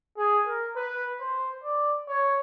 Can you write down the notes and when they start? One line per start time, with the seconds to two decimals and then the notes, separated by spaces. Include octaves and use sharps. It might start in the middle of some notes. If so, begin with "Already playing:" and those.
0.17 G#4
0.47 A#4
0.76 B4
1.20 C5
1.64 D5
2.08 C#5